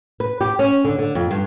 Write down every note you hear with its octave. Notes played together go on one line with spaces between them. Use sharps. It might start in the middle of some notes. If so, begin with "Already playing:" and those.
B4
G4
C#4
D3
D3
F2
G2